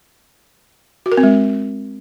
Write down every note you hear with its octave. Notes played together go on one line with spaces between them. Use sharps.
F#4
A#4
C4
G#3